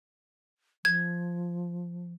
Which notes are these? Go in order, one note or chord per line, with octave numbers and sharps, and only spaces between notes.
F3 G#6